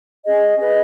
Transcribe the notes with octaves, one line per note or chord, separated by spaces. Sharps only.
C#4 G#4 D#5
G#4 B4 D#5